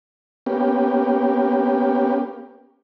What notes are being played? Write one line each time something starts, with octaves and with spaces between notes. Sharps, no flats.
A#3 B3 C#4 G4